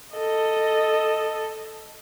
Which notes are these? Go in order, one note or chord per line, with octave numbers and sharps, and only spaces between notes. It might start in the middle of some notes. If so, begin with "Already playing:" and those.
A4 D#5